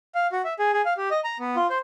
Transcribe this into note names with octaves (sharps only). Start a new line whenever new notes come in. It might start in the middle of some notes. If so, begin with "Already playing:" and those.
F5
F#4
E5
G#4
G#4
F5
G4
D#5
A#5
B3
F4
C5